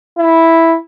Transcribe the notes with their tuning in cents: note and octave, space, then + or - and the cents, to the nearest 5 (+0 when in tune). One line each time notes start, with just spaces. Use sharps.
E4 -5